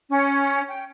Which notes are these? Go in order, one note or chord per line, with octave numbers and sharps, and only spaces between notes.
C#4
G5